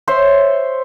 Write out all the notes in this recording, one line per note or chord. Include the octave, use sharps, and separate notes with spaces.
C5 C#5 E5 C6